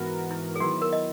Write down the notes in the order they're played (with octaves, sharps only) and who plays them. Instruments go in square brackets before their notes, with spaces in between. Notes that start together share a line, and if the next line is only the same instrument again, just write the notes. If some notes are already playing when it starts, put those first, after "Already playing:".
Already playing: [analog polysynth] G#2 E3 B3 F#4 A#4
[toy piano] E4
G#4
[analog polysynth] D#3 F#3 B3 E4 [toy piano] F#4
[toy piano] A#4
D#5